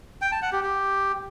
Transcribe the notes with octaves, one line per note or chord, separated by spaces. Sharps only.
G5
A5
F#5
G4
G4